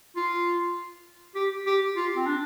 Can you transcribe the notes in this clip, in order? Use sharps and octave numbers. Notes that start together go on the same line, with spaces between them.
F4
G4
G4
F4
C4
D4